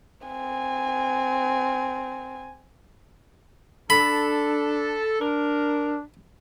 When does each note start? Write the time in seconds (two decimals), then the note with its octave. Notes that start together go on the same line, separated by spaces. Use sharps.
0.27 C4 G#5
3.90 D4 A4 B5
5.21 D4 A#4